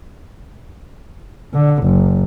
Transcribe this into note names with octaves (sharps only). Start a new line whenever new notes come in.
D3
F#1